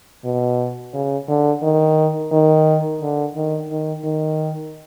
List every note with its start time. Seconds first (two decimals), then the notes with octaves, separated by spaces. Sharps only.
0.24 B2
0.93 C#3
1.28 D3
1.62 D#3
2.32 D#3
3.01 D3
3.35 D#3
3.70 D#3
4.04 D#3